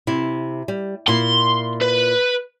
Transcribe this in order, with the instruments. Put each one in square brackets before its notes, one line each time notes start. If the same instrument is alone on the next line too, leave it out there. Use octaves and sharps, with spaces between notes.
[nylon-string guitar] C3 E4
G3
[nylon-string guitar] A#2 E4 [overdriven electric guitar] C6
[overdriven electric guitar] B4